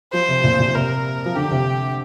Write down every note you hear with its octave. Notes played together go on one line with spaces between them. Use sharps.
F3 C5
C3
A#2
A#2
C3 A#4
F3
D3 G4
C3